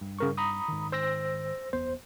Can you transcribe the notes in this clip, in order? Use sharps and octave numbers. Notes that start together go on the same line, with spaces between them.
G2
C#3 A#4 C#6
A#5 B5 D#6
G#2 D#3
C5 E6 A#6
F#1 E2 B3 C5